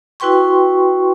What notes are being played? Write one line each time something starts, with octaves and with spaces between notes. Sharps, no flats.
E4 F#4 B4 G5 C6 C#6